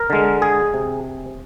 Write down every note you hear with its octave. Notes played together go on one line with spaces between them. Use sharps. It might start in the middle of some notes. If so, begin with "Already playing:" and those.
Already playing: A#4
D3 G#3
G#4
C3